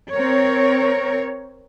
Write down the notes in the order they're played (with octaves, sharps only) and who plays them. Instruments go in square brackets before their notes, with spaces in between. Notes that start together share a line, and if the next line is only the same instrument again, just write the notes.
[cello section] C4 A#4 C#5